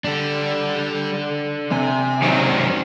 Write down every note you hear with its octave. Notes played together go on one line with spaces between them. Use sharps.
G3 D4 A4
C3 G#5
D#3 F#3 C#4 C5 D5